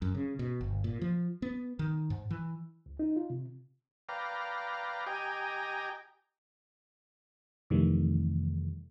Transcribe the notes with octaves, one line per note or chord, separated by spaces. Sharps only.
F#2
C#3
B2
G1
A#2
F3
B3
D#3
G#2
E3
C#2
D#4
F4
C3
B4 D5 F5 G5 A#5
G4 D#5 G5 G#5 A#5
F2 C3 D#3 E3 G3 A3